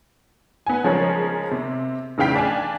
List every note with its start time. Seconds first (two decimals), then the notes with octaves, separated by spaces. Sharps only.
0.67 B3 G#5
0.84 C#3 F3 G#3 C#4 G#4 A#4
1.51 C3
2.18 F1 C#3 E3 F5 G5 B6
2.35 D4 G#5